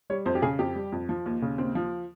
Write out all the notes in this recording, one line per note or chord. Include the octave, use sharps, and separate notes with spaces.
G3 C#5
F2 C5
G4
C#3 G#4
F2 G4
G3
F2
F3
D#2
C#3
D#2 C4
F3